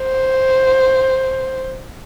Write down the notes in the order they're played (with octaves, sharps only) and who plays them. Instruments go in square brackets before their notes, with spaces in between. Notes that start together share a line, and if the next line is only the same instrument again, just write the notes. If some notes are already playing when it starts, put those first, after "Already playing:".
Already playing: [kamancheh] C5